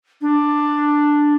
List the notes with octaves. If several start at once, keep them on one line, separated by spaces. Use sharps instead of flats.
D4